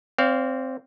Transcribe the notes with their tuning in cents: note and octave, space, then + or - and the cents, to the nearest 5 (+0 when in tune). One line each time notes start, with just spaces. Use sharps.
C4 +0 D5 -45 F5 +0